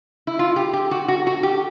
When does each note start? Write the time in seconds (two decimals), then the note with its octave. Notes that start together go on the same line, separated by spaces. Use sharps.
0.27 E4
0.39 F4
0.56 G4
0.73 G4
0.91 F#4
1.08 F#4
1.27 F#4
1.43 G4